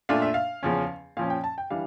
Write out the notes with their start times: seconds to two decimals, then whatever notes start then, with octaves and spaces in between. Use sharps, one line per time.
0.09 A#2 A3 D4 F4 F5
0.22 E5
0.34 F5
0.63 E2 C#3 F3 C#4
1.17 A#2 F3 C#4 F5
1.30 G5
1.44 A5
1.58 G5
1.70 E3 G3 D4 F5